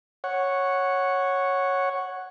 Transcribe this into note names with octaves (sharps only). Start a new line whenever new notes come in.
C#5 F#5